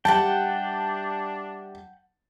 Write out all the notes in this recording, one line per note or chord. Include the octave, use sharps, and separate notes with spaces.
G3 D4 G4 E5 F#5 G5 A5